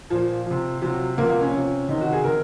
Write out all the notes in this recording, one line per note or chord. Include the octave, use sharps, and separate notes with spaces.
A#2 F3
C3 F3
C3 F3 F#3
C3 F3 A#3
A#3
C#4
C3 F3
C3 D#3 D#4
F#4
G#4
C3 D#3 A#4